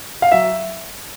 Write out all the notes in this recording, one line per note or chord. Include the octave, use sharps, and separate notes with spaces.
F5
F#3 E5